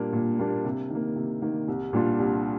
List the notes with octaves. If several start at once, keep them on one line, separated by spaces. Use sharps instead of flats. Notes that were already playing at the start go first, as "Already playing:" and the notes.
Already playing: A#2 G3 A#3 D4
A#2
G3 A#3 D4
C3
D#3
A#3
C3
D#3 A#3
C2
A#2 G3 D4 F4
C2